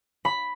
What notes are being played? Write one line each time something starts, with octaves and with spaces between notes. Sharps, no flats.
B5